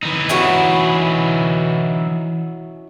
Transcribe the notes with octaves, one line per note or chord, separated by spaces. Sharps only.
E3 D#4
C#4 E4 F#4